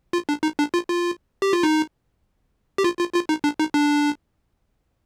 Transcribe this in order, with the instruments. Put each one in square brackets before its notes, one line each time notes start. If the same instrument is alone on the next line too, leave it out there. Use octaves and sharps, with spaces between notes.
[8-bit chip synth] F4
D4
D#4
D4
F4
F4
G4
F4
D#4
G4
F4
F4
F4
D#4
D4
D#4
D4